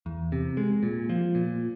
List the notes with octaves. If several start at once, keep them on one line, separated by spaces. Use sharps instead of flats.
E2
C3
G#3
A#2
F3
A#2